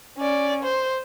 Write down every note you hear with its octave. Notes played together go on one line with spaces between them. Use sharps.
C#4 D5
C5